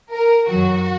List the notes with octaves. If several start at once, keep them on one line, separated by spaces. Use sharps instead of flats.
A#4
F#2 D#3 F#3 F#4